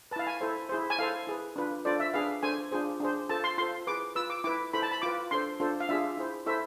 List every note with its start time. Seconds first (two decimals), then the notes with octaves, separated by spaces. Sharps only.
0.11 B4 A5
0.16 E4 F5
0.27 G#5
0.41 E4 A4 C5
0.69 E4 G#4 C5
0.90 G#5
0.99 E4 A4 C5 F5
1.27 E4 G#4 B4
1.56 D4 F4 B4
1.85 D4 F4 A4 C5 D5
2.00 E5
2.14 D4 G#4 B4 F5
2.43 D4 A4 C5 G#5
2.72 D4 F4 G#4 C5
3.00 D4 G#4 C5
3.29 F4 A4 C5 A5
3.44 C6
3.58 F4 A4 C5 C6
3.87 E4 G#4 B4 D6
4.15 F4 B4 E6
4.30 D6
4.44 E4 B4 D6
4.73 E4 A4 C5 B5
4.82 A5
4.91 B5
5.02 F4 B4 D6
5.31 D4 A4 C5 C6
5.60 D4 F4 A4 C5
5.80 F5
5.89 D4 F4 G#4 E5
6.17 E4 G#4 C5
6.46 E4 A4 C5 E5